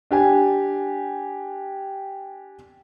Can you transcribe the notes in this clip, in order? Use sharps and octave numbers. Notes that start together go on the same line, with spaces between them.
D4 G4 G#5